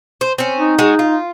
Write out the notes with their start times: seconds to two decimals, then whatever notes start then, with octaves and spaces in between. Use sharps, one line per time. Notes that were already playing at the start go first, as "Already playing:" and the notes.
0.21 C5
0.38 C4 C#4
0.58 D#4
0.78 G#3 F#4
0.99 F4